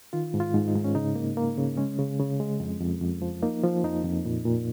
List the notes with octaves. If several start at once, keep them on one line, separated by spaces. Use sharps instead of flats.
D#3 F4
G#2
F4
G#2
D#4
G#2
C#4
C#3 D#4
A#3
A#3
C#3
G#3 C#4
C#3
C#3
G#3
F2
F2
F2
F3
A#3 D#4
F3
F2 D#4
F2
A#2
A#2